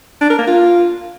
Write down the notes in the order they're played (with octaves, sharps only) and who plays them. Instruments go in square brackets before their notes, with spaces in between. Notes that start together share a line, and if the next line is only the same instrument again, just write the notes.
[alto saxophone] D4
A#4
A#3
F4